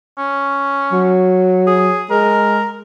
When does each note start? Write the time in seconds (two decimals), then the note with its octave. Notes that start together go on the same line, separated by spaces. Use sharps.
0.18 C#4
0.92 F#3
1.67 G#4
2.11 G#3 A#4